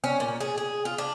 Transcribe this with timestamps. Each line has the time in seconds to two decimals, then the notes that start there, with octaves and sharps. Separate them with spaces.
0.04 C#4
0.20 A#2
0.40 G#4
0.58 G#4
0.85 F4
0.98 D4